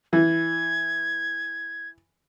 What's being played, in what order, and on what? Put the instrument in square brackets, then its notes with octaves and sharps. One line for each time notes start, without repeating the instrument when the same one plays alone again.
[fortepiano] E3 [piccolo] G#6